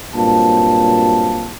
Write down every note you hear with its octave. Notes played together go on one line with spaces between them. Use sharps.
G2 A#2 F#3 C4 F5 A5